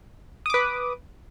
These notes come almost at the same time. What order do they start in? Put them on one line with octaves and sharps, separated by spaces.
D#6 D6 B4